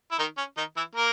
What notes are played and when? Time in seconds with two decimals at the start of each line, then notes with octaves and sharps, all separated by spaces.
0.11 E4
0.18 D#3 D#4
0.37 C#4
0.57 D#3 D#4
0.76 E3 E4
0.95 A#3 A#4